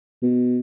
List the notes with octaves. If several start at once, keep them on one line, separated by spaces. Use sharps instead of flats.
B2